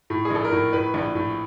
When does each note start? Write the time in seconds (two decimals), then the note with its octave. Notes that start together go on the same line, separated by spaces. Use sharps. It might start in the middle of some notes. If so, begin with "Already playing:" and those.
0.10 A2
0.25 G#4
0.30 A#1 A4
0.44 A#4
0.52 A2
0.73 A2 B4
0.94 A#1
1.15 A2